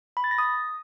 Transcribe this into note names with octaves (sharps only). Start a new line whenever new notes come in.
B5
A6
A#6
D#6